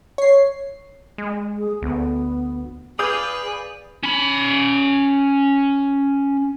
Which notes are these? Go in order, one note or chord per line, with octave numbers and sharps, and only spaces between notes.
C#5 C7
G#3
G#4
D2 B3
G#4 B4 D5 F5 D#6 G6
C#4 B5